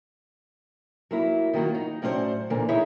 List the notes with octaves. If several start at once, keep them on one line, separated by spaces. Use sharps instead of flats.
F#3 A#3 E4
D#3 F#3 A#3 F4 F#4
D#4
A2 F#3 C#4 D4 C5 D5
A#2 D3 E3 A#3
D#4 E4 G#4 C#5 E5